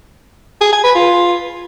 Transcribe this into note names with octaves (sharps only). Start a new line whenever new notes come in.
G#4
G#5
B4
F4